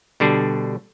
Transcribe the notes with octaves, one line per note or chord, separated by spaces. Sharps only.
B2 D3 G3 D4